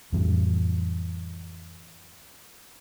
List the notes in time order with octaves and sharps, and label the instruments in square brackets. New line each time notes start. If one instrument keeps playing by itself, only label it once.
[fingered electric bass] F2 A2 E3 G3